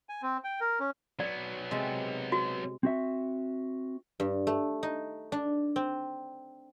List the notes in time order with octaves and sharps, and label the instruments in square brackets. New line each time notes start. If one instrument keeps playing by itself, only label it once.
[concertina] G#5
C4
G5
A#4
C#4
[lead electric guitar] F#3 B3 [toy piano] D5
[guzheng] C3 G#3 A5
[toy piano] F#4
[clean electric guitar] C4 F#4 E5
[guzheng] G2
A3
D#4
D4
C4